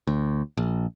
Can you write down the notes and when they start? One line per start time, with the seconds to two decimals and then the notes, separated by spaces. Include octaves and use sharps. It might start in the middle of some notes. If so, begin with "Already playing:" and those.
0.07 D2
0.57 A#1